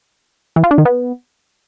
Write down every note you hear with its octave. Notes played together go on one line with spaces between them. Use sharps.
E3
F4
D4
D#3
B3